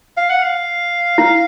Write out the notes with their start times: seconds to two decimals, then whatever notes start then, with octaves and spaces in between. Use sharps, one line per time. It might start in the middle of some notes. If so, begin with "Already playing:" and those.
0.17 F5
0.30 F#5
0.43 F5
1.18 E4